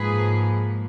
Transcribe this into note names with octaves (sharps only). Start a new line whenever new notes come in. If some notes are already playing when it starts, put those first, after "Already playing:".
Already playing: G#2 F3 A#3 G#4 B4